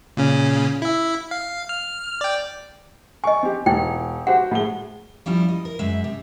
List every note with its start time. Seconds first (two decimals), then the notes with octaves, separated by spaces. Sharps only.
0.17 A#2 C#3 C#4
0.82 E4 E5
1.31 F5
1.69 F6
2.21 D5 G5
3.24 D#5 G#5 C#6
3.43 C4 G4
3.66 E1 D#4 E4 G5
4.27 F#4 G4 C5 F#5
4.51 A2 G#3 G7
5.26 F3 G3 C#4 E4
5.49 D#5
5.65 A#4
5.79 F#2 G#3 E5
6.04 C3